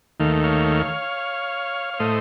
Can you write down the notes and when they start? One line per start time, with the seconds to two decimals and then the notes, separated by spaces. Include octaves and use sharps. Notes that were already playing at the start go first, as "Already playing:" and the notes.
0.20 D#2 D#3 A3 F5
0.44 C#5 F5
1.94 C#5
1.99 A2 A3 C5 D#5